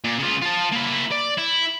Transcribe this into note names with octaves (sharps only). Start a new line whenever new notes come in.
A#2
C#3 F4
F4 A5
A#3 E4
D5
E4